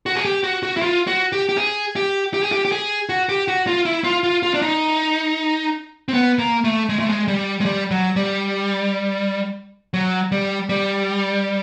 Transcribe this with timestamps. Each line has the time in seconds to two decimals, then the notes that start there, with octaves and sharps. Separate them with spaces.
0.06 F#4
0.16 G#4
0.25 G4
0.43 F#4
0.63 F#4
0.77 E4
0.82 F4
1.07 F#4
1.32 G4
1.49 G4
1.58 G#4
1.96 G4
2.34 G4
2.43 G#4
2.52 G4
2.65 G4
2.72 G#4
3.09 F#4
3.29 G4
3.48 F#4
3.67 F4
3.85 E4
4.04 F4
4.24 F4
4.43 F4
4.54 D4
4.62 D#4
6.08 C4
6.14 B3
6.39 A#3
6.64 A3
6.89 G#3
6.99 A3
7.09 G#3
7.28 G3
7.61 G#3
7.65 G3
7.91 F#3
8.16 G3
9.94 F#3
10.32 G3
10.69 G3